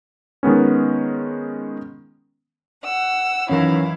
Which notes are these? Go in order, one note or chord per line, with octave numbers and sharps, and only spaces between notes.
D#3 G#3 B3 C#4
F#5 E6
F#2 D#3 E3 C#4 E4 A#4 F5